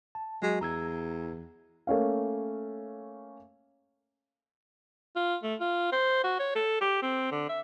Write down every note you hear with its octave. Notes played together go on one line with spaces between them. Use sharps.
A5
F#3 G#3 F#4
E2 A#5 E6 G#6
A3 A#3 C#4 F5
F4
A3
F4
C5
F#4
C#5
A4
G4
C4
D3
E5